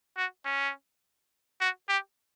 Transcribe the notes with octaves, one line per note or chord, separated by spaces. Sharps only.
F#4
C#4
F#4
G4